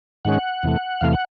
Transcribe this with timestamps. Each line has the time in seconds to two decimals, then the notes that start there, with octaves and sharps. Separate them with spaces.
0.25 G#2 D#3 G#3 C#4 F#5
0.63 E2 C3 E3 A3
1.01 E2 C3 E3 A3 F5
1.13 F#5